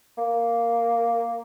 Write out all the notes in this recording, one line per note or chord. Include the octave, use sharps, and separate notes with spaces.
A#3